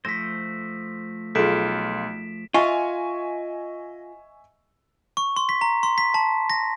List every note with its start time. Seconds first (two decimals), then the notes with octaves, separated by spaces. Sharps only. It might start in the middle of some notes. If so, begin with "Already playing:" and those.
0.05 F3 A3 C5 A#6 B6
1.35 B1 F4 G#4 A4 B6 D7 E7
2.54 F4 D#5 E5 G#5 C#6
5.17 C#6
5.36 C6
5.49 B6
5.61 A#5
5.83 C6
5.98 B6
6.14 A5
6.50 A#6